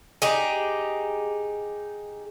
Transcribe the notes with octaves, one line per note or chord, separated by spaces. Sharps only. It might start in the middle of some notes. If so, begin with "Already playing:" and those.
D#4 G4 G#4